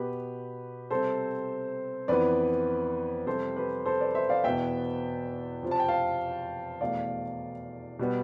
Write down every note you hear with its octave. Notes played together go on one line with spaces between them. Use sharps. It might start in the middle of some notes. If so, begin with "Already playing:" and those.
Already playing: B2 B3 G4 B4
C3 G3 C4 A4 C5
F2 E3 B3 B4 D5
F2 C3 G3 A4 C5
G4 B4
A4 C5
B4 D5
C5 E5
D5 F5
E2 B2 B3 E5 G5
F2 C3 F3
A5
G5
F5 A5
E2 B2 A3 D5 F5
B2 G3 B3